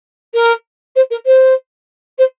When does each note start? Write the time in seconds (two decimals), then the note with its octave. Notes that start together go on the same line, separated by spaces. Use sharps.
0.34 A#4
0.96 C5
1.10 A#4
1.26 C5
2.18 C5